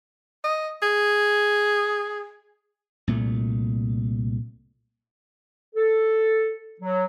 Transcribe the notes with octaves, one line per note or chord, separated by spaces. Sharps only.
D#5
G#4
C2 A#2 A3
A4
F#3